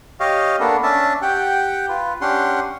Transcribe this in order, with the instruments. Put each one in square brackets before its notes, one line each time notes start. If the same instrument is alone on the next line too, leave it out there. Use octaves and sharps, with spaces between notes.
[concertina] G4 C#5 D#5 F5
A#3 B3 D4 A4
C#4 D4 E5 A5
G4 F#5 G5
F4 B4
C#4 D4 G4 F#5 C6